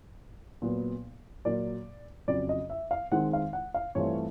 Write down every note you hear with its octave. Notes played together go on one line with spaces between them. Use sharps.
A#2 F#3 B3
A#2 F#3 A#3 D5
F2 C#3 F#3 D5
D#5
E5
F5
D#3 G#3 C4 D#4 F#5
F5
F#5
F5
G2 E3 A3 C4 F4 C#5